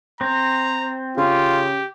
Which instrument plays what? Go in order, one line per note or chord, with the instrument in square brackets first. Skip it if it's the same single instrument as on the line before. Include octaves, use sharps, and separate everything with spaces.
[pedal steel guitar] C4 [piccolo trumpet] A#5
[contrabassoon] C#3 [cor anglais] F4 [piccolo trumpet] G4